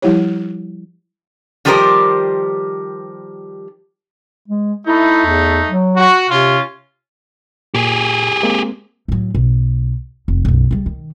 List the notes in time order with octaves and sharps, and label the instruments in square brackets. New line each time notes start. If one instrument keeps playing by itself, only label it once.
[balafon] F3 G3 E4 G4 C#5
[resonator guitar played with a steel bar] D#3 F3 G3 G4 A#4 C5
[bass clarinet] G#3
[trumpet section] A3 D#4 [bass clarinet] E4
[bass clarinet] E2
F#3
[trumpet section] F#4
[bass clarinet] C3 [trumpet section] C#4 F4
[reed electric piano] A#2 [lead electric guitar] G4 G#4
[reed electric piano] G#3 A#3 C4
[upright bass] A2 F#3
B1
F1
B1 F#2
C#3 G3
D#3